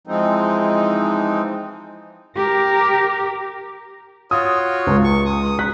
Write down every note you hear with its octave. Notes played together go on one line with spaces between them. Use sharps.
E3 F3 G#3 C4 D#4
G4 A#4
F4 F#4 C#5 D#6
C#2
C#6
D#6
A#5 F#6 B6